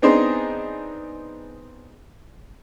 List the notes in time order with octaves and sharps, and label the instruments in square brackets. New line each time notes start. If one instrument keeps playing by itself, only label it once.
[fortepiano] B3 C4 D4 D#4 G#4 C5